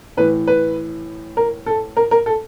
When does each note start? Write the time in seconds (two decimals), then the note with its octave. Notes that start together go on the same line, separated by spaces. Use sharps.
0.17 A2 E3 B4
0.47 B4
1.37 A#4
1.66 A4
1.97 A#4
2.11 A#4
2.26 A4